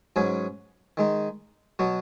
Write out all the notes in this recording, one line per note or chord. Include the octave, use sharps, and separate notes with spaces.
G#2 F#3 C#4 G#4 B4
D#3 G#3 D#4
B2 F#3 B3 F#4